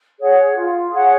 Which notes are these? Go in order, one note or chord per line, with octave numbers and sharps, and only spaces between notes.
G#4 C#5 F#5
F4
G#4 C#5 F#5